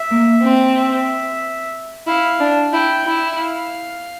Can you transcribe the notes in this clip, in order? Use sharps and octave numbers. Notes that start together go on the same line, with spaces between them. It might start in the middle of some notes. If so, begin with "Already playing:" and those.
Already playing: E5
A#3
C4
E5
E4 F5
D4
E4 G5
E4
F5